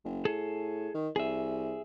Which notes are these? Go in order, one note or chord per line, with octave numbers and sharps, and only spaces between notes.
F#1
A2 G#4 A4
D#3
C2 G#4 E5